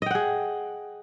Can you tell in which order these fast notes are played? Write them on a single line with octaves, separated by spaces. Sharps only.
D#5 G5 F#5 G#4